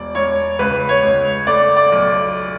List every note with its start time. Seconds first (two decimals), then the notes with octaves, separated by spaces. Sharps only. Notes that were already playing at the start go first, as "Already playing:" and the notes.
Already playing: E1 D5
0.15 E1 C#5
0.59 C#2 B4
0.89 C#5
1.03 C#2
1.47 A3 D5
1.77 D5
1.92 B1